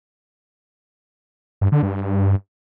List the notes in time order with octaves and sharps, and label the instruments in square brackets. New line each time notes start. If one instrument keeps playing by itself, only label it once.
[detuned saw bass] G2
D3
G2